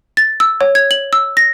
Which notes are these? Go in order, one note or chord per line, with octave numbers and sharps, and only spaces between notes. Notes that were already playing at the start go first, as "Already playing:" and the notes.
A6
E6
C#5
G#6
F#7
E6
A#6